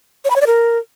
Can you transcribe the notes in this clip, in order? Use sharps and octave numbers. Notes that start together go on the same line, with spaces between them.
C#5
B5
C#5
D5
A#4